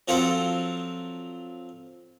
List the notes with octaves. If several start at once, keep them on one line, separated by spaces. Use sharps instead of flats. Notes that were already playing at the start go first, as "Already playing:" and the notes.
F3 F#3 C4 F4 A4 C5